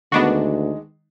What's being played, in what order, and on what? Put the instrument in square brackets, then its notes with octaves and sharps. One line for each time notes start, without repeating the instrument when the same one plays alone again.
[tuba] D2 [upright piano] D#3 G#3 D#4 [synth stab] B3 D4 F#4